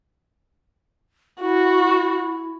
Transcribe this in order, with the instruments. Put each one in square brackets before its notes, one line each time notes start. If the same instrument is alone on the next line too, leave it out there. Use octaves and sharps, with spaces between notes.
[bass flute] E4 [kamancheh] F#4